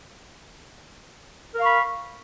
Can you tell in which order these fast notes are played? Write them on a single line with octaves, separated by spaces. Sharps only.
A#4 F5 C#6 B5